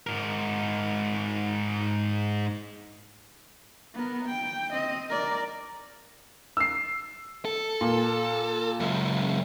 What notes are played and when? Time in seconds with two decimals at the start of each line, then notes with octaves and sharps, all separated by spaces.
0.07 G#2 A#4
3.94 B3 A#4
4.25 G5
4.72 C4 D#5
5.09 A#4 D5
6.57 E6 C7
7.45 A4
7.81 A#2
8.80 C#2 F#2